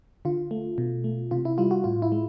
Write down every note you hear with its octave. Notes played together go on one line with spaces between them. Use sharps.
D3 F4
A3
B2
A3
C3 F4
E4
G3 F4
F#4
A2 F4
E4
G#3